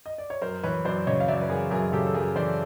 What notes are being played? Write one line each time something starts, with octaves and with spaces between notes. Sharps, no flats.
D#5
D5
C#5
F#2 A#4 C5
E3 B4 C#5
F#2 C5 D5
C#3 C#5 D#5
F5
F#2 D5 E5
B4
E3 G#4 A#4
F#2 G#4 A#4
C#3 G4 A4
A4
F#2 G#4 A#4
E3 C5 D5